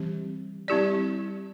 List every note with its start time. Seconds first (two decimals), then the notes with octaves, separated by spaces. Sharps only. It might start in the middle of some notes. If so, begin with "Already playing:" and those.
Already playing: E3 G3 C4 G4
0.68 G3 C4 E4 G4 D5